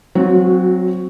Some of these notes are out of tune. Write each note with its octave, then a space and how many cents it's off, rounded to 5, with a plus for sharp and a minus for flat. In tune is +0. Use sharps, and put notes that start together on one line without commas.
F#3 +0 C4 +0 F#4 -30